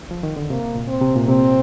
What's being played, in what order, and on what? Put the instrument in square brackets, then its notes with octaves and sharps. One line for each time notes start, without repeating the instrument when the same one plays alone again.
[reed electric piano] F3
D#3
D3
[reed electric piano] C3 [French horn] A#3
[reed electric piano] A#2
[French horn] C4
[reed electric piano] C3
A#2
[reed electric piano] C3 [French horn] C4